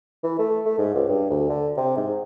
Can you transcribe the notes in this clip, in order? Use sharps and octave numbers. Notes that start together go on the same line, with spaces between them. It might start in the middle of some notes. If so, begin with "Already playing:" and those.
E3
A3
A3
G#2
C#2
G2
D2
D3
C3
G#2